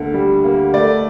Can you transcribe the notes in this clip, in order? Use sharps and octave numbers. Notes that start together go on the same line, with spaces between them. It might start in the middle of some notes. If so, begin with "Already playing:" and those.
Already playing: D2 D3 A#3
G3
A#3
A3 D5